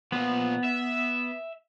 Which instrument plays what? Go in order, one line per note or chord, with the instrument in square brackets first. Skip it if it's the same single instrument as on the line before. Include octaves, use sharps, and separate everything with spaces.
[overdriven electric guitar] A#2 F3 [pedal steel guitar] B3
[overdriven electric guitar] E5